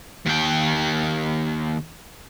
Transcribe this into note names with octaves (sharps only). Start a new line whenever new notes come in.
D#2 G5